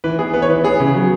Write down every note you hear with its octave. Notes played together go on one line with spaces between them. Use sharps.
E3 B4
B3 G#4
B3 B4
C#5
E3 B4
B3 G#4
C#3
F#3